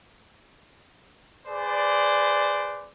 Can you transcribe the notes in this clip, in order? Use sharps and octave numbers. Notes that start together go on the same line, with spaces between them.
G#4 B4 C5 D5